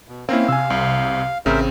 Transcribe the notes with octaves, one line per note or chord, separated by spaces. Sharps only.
B2
A#3 C4 C#4 E4 F5
C3 G#5 E6
C2
A1 C#3 C4 A#4 C5 E5